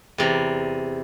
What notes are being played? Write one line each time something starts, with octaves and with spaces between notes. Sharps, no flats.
E2 C3 D5 A#5